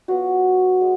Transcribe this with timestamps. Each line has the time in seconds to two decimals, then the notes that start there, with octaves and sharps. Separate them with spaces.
0.08 F#3 B3 F4 F#4
0.81 G#3